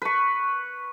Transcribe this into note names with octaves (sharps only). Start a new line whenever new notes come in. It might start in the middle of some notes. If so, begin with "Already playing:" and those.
B4 C#6